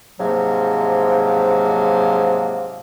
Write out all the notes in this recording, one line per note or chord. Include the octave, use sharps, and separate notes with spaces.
G#2 C3 F3 F#3 A#3